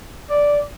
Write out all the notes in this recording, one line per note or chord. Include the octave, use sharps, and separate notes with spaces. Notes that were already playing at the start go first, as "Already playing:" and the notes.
D5